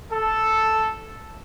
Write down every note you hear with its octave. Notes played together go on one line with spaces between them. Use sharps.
A4